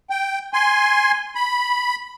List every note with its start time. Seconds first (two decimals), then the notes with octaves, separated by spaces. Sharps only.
0.10 G5
0.54 G#5 C6
1.35 B5